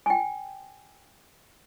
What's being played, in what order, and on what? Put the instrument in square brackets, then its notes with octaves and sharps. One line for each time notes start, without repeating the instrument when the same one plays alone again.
[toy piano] G5 G#5